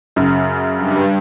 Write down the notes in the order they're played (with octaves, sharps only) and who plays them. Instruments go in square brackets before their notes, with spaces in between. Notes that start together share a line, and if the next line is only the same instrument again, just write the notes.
[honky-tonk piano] F#2 C#3
[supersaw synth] G2